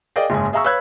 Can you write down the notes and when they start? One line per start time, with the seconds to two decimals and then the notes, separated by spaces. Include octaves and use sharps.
0.16 G#4 A#4 D5 D#5 F5 G5
0.30 F#1 G#2 G#4 G#5
0.53 G#4 E5 F5 A#5 C#6 E6
0.64 B4 C#5 F5 E6 F#6 G#6